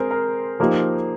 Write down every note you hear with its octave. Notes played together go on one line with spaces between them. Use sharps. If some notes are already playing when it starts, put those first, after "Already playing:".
Already playing: G#3 C4 G#4 A#4 C5
A#4
F3 A#3 D#4 G4